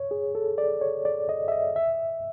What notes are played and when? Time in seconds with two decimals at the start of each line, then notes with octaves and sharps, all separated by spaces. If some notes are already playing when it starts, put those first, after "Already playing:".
Already playing: C#5
0.11 G#4
0.35 A4
0.58 D5
0.81 C#5
1.05 D5
1.29 D#5
1.48 E5
1.52 D#5
1.76 E5